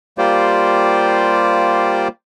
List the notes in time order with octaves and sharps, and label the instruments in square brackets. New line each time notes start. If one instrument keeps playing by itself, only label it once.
[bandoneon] G3 A#3 F4 G4 C5 D5